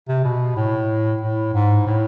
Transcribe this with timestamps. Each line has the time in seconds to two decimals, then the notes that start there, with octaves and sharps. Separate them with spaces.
0.08 C3
0.24 B2
0.56 A2
1.21 A2
1.54 G#2
1.86 A2